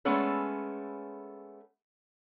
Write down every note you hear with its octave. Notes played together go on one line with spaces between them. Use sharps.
G#3 A3 B3 C#4 A4